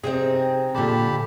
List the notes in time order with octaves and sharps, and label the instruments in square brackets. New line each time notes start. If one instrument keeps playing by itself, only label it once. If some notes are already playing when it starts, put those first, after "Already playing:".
[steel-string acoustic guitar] C3 [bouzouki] C4 D#4 G#4
[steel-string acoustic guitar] A#2 D3 D4 [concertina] G4 A5 B5